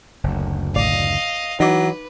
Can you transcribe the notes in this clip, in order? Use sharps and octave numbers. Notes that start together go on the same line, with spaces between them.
F#1 D2
A1 D5 D#5 F5
E3 F#3 D#4 B4 D6